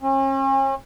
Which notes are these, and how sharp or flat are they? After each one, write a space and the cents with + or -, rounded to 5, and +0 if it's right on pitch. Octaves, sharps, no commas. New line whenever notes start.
C#4 -40